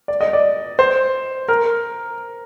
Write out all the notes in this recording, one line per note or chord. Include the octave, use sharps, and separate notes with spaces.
D5
D#5
D5
C5
A#4